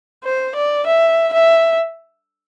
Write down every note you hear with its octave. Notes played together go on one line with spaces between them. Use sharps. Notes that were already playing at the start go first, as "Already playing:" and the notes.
C5
D5
E5
E5